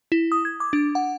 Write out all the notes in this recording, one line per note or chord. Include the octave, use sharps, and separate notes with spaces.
E4
D#6
G#6
D6
D4
F#5